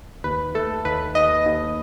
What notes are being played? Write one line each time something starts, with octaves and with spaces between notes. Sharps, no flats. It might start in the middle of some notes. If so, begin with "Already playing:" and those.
D#2 B4
A3 A4
D#2 B4
D#2 D#5
D#2